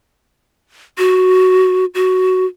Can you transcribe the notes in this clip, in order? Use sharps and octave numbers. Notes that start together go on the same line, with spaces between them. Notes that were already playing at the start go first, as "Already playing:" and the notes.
F#4
F#4